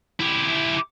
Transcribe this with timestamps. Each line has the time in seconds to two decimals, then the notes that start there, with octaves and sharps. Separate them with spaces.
0.20 E4 G4